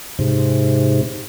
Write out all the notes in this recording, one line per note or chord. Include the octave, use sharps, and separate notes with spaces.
G#2 C3